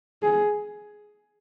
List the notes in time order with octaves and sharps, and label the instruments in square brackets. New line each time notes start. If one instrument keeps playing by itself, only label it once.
[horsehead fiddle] G#4